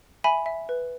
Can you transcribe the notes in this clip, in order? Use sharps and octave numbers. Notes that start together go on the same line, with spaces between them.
E5 G#5 B5
E5
B4